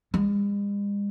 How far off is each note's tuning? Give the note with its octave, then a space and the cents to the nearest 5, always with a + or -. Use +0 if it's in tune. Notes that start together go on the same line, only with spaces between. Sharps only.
G#3 -45